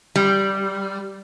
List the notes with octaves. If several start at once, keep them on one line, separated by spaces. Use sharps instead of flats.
G3